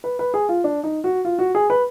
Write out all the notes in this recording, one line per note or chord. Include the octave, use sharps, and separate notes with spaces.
B4
B4
G#4
F4
D4
D#4
F#4
F4
F#4
G#4
B4